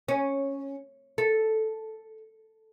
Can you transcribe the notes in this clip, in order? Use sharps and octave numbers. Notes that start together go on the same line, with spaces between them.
C#4
A4